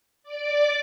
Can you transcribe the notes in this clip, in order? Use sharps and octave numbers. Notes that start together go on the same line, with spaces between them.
D5 D6